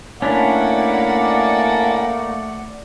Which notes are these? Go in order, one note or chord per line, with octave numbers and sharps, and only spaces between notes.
A3 A#3 C#4 D4 E4 D5 F#5